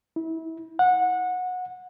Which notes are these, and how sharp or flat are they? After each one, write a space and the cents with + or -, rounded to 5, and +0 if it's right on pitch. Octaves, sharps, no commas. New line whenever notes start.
E4 -30
F#5 -20